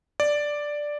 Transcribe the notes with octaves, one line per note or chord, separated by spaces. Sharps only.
D5